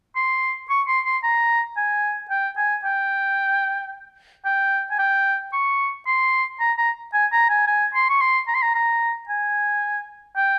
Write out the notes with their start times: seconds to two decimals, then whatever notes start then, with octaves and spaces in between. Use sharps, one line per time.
0.16 C6
0.70 C#6
0.87 C6
1.05 C6
1.23 A#5
1.77 G#5
2.30 G5
2.57 G#5
2.85 G5
4.45 G5
4.91 G#5
4.99 G5
5.53 C#6
6.06 C6
6.60 A#5
6.78 A#5
7.14 G#5
7.32 A#5
7.50 G#5
7.67 G#5
7.94 C6
8.09 C#6
8.21 C6
8.48 A#5
8.55 C6
8.62 A#5
8.75 A#5
9.28 G#5
10.36 G5